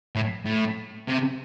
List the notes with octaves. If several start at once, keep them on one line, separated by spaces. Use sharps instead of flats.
A2
A2
C3